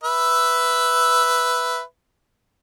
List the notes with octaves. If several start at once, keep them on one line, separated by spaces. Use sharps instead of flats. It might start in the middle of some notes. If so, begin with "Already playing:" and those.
B4 E5